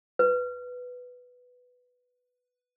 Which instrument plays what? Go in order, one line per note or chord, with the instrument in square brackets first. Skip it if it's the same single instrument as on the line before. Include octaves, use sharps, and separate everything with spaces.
[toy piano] B4